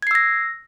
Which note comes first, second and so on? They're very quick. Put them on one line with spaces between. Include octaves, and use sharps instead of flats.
G#6 C7 E6 A#6